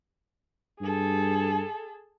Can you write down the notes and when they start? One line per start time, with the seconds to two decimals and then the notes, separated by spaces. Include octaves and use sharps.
0.81 G2 G#4 A4